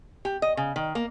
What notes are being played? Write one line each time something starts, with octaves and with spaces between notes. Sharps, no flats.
G4
D#5
C#3
D#3
A#3